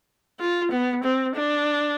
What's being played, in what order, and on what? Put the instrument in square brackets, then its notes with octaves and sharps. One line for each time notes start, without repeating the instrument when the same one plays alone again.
[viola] F4
B3
C4
D4